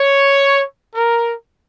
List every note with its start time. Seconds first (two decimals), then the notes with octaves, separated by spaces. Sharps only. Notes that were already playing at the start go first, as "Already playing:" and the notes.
Already playing: C#5
0.95 A#4